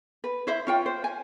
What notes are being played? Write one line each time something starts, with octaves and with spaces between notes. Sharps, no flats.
B4
E4 C5 E5
C#4 F4 G5
C5
G#5